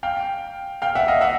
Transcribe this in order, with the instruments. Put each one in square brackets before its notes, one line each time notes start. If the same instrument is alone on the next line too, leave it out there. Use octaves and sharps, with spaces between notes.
[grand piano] F5 G5
F5 G5
E5 F#5
D#5 F5
E5 F#5